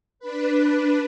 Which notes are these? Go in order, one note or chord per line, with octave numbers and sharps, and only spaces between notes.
D4 B4